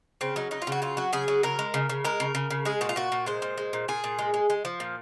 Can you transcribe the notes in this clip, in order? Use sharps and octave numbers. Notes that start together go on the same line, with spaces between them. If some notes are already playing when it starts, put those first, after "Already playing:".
C#3 C4
F#3 D#4
F#3 D#4
F4
C#3 F#4
F#3 F4
F#3 F#4
C#3 G#4
F#3
C#3 A#4
G#3
C#3
C#3
G#3 A#4
C#3
C#3
C#3
G#3 G#4
A#2 F#4
F4
A#2 F#4
A#2
G#3 C5
A#2
G#3
A#2
A#2 G#4
A#2
G#3
G#3
G#3
F3
A#2